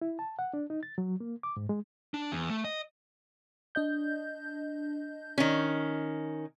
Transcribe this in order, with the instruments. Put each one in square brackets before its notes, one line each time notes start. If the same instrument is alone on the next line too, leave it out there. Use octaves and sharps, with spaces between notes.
[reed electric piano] E4
A5
F#5
D4
D#4
A6
F#3
A#3
D6
G#2
G#3
[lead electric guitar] D4
E2
A3
D#5
[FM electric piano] D4 D#5 G6
[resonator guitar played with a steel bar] D#3 C#4